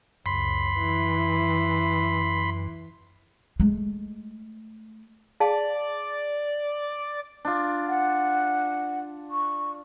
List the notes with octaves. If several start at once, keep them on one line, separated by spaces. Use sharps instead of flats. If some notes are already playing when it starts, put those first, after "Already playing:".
C#2 F#2 B5 C6
E3
G#3 A3
G#4 D5 F5 A5
D4 F4
F#5
C#6